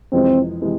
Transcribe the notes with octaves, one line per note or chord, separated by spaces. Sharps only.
F2 C3 E3 G#3 C4
C3 E3 G#3